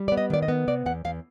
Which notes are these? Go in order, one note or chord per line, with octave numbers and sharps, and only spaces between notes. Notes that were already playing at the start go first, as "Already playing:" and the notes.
Already playing: G3
B3 D5
D#5
D#3 D5
D#5
B3
C3 D5
E2 F#5
E2 F5